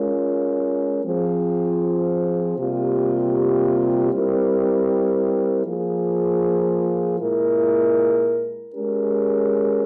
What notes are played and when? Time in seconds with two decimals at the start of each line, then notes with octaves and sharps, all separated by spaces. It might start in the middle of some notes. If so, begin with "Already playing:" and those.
Already playing: G#3 C#4 F4 A#4
1.03 F3 C4 F4 G#4
2.58 C3 G3 A#3 F4
4.12 G3 C4 E4 A#4
5.66 F3 A#3 F4 G#4
7.19 A#2 G#3 E4 A#4
8.74 G#3 C#4 G4 A#4